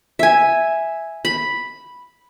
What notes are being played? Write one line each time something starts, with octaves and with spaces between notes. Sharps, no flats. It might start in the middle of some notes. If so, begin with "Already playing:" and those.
E5 G#5
B5